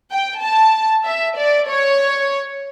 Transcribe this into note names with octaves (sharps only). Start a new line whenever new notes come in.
G5
A5
E5
D5
C#5